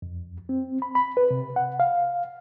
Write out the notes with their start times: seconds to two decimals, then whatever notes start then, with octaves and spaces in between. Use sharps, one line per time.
0.02 F2
0.49 C4
0.82 B5
0.95 B5
1.17 B4
1.31 C3
1.56 F#5
1.80 F5